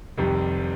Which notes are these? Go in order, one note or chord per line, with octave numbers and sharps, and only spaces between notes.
F1 F2 C3 D#3 G3